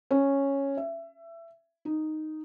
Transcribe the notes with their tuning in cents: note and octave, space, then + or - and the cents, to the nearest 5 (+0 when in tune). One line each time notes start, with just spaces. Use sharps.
C#4 -5
E5 +20
D#4 -5